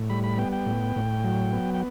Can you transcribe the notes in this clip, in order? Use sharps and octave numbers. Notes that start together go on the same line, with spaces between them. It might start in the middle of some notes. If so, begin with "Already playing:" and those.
Already playing: A2
G3 B5
B5
B3 G5
G5
A2
A2
F#3
B3
G5